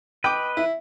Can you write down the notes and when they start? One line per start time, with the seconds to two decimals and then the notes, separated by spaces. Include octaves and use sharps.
0.24 B4 D#5 G5 D6
0.57 E4